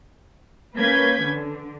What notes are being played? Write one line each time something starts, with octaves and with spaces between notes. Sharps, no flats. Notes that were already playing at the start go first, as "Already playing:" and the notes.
A#3 C#4 B4 G6 G#6 B6
D3